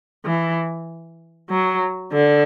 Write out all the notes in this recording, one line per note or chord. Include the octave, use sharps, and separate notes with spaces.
E3
F#3
D3